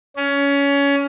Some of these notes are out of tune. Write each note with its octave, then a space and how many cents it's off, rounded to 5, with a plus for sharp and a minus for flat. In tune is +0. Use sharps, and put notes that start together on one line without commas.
C#4 +20